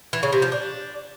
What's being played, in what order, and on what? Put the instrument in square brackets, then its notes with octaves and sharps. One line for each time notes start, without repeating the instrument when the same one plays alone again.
[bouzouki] E3
C#3
C3
F3
D4